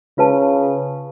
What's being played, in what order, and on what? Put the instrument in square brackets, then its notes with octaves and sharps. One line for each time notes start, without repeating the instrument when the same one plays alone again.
[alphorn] C#3 [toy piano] F4 B4 A5